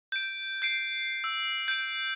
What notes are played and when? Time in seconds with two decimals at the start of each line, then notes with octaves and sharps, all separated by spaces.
0.12 G6 D7
0.62 G6 C7 D7
1.24 E6
1.68 G6 D7